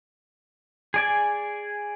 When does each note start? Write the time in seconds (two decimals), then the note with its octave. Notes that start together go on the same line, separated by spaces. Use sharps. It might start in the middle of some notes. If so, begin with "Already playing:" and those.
0.94 G#4 D5 G#5